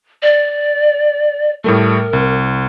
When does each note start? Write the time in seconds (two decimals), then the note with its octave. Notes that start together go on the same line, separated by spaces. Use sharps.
0.22 D5
1.64 A2 G3 A3 A#4
2.13 C2